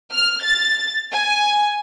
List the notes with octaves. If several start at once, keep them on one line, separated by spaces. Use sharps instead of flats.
F6
A6
G#5